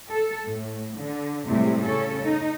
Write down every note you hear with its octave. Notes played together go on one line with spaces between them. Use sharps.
A4
A2
D3
A2 C3 G3 G#3 E4
C#3 C#4 A4
D#4